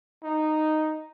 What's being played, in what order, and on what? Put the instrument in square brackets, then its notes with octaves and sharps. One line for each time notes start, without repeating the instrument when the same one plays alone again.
[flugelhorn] D#4